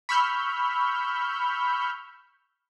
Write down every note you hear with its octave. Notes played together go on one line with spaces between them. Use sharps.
B5 C#6 E6 F6 G6